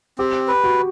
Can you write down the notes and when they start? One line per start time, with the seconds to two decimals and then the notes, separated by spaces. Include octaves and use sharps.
0.18 C4 G4
0.48 B4
0.64 F#4